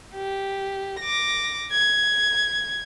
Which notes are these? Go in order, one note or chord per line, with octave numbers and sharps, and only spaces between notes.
G4
D6 A#6
G#6